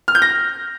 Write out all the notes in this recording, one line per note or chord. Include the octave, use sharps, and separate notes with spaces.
F6
G6
A#6